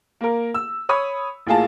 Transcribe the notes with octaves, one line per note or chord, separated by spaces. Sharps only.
A#3 A#4
E6
C#5 B5 D#6
A1 A#3 F4 G#4 A5